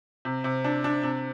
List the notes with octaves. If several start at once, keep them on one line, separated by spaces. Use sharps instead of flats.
C3
C3
D4
D4
C3